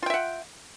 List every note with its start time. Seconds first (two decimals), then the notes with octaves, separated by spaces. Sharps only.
0.03 F4
0.06 G5
0.10 E5
0.14 F#5